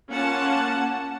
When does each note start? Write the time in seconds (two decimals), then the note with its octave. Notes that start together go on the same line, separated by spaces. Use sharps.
0.10 A#3 C#4 F4 F#5 A5